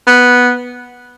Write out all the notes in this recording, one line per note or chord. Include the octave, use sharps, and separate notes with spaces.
B3